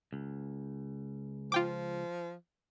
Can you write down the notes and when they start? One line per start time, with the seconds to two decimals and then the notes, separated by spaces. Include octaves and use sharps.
0.13 C#2
1.52 F3 F4 G5 D6